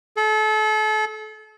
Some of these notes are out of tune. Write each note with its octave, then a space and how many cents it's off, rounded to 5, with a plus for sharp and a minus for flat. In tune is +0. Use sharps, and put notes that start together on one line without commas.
A4 -35